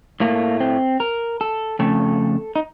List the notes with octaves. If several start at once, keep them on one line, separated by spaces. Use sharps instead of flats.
A2 A3 A#3
C4
A#4
A4
F2 C#3 A3 A4
D#4